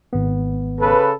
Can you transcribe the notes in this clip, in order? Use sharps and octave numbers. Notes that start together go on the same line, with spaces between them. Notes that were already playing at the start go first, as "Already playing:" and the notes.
G#1 B3
C#3 A4 B4